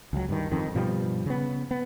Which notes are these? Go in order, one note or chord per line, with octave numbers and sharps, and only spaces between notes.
C#2 F#3
G2 D#3
F2 D#3
G2 B2 F3 G3
C#3 B3
B3